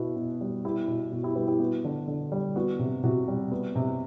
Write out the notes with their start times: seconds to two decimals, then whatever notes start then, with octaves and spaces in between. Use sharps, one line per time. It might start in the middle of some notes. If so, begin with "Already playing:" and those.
Already playing: B2 B3 E4 F#4
0.16 B2
0.41 G3
0.65 B3 E4 G4
0.88 B2
1.12 B2 F#4
1.23 E4 G4
1.35 G3 G4 B4
1.47 E4 G4
1.60 B3 F#4
1.84 D3
2.08 D3
2.32 G3
2.56 B3 F#4
2.79 C3
3.03 C3 F#4
3.28 G3
3.52 B3
3.75 C3